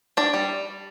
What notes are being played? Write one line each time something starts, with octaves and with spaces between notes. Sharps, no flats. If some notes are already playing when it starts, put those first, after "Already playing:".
D4 D5
G3